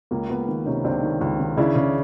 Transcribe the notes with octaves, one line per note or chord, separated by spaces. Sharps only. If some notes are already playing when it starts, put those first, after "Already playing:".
C#2 A#3
C#2 B3
D#3
C3 C#4 D#4
C#2 C4 D4
D#3
C#2
D#3
C#3 D4 E4
C#3